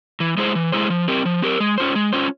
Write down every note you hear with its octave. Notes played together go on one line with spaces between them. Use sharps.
E3
G#3 E4 G#4 C5
E3
G#3 E4 G#4 C5
F3
C4 G4 A#4
F3
C4 G4 A#4
G#3
C#4 F4 C5
G#3
C#4 F4 C5